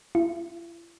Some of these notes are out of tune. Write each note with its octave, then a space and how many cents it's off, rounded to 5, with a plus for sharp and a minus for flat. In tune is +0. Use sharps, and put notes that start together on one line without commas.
E4 +40